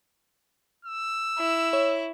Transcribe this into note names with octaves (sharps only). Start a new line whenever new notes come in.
E6
E4
C#5